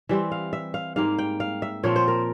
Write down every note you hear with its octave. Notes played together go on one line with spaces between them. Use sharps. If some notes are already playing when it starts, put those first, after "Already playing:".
E3 G3 C4 E5
F5
E5
F5
G#2 G3 A#3 F5
G5
F5
E5
A#2 F3 C4 C#5
C5
A#4